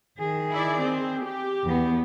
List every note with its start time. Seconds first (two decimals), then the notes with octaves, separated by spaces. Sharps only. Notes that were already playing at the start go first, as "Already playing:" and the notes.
0.18 D#3 G#4
0.51 E4 D5
0.81 C4
1.24 G4
1.64 E2 B3